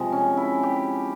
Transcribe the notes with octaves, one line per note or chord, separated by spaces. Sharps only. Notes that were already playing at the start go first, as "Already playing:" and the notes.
Already playing: C3 F3 G#3
C#4
E4
G4